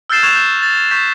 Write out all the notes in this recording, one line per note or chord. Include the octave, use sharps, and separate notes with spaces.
E6 F6 G6 A6 C7 E7
C#6 F#6 G#6 A6 E7 F7
G6
A6
C#6 G6 B6